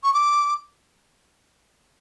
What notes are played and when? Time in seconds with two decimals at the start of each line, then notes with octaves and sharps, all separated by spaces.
0.04 C#6
0.14 D6